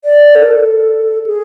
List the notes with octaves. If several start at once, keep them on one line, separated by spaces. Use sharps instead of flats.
D5
A4
A#4
A4
G#4